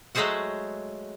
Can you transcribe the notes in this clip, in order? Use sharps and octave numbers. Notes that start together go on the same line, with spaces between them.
F#3 G#3 A3 G#4 C5 F#5